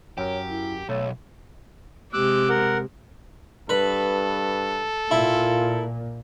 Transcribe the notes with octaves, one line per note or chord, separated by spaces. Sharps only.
F#2 G4 A#4 C#5
E4
B1 A3 C#5
C3 G#3 G4 D6 E6 F#6
A#4 F#5
G2 A4 B4
A#2 E4 F4